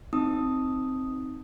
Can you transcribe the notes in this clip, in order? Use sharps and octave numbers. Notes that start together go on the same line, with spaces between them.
C4 D#4 D#6